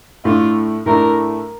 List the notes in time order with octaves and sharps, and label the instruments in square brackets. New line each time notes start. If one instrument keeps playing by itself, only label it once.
[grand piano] A2 A3 D4 [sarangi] F4
[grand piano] A2 A3 D4 [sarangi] A#4